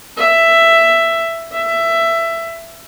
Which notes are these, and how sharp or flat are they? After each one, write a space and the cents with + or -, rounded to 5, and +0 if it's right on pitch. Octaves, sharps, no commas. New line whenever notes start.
E5 +10
E5 +15